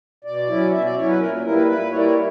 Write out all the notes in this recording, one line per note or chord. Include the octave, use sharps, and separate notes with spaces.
B2 D5
F#3 C#4 E4
B2 E5
D5
F#3 C#4 E4 C#5
B4
A#2 A#4
G3 A#3 E4 A#4
B4
A#2 B4
G3 A#3 E4 C#5
D5
C#5